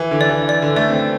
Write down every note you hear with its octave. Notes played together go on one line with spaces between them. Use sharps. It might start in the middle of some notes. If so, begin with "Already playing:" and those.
Already playing: E3
D3
D5
E3
D5
D3
A3 D5
C4